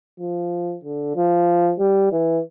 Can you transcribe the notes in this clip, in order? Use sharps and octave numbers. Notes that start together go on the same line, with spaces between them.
F3
D3
F3
G3
E3